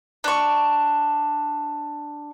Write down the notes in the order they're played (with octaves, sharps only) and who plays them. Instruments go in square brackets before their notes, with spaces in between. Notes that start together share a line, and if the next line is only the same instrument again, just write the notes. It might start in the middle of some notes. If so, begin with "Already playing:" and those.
[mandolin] D4 C#6